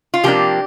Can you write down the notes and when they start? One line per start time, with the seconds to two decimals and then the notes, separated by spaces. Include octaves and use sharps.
0.14 F4
0.23 C3 F3 A#3 D4 G4